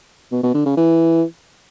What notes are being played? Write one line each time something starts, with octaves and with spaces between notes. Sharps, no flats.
B2
B2
D3
C#3
E3